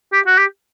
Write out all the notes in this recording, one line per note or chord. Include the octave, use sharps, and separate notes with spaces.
G4
F#4
G4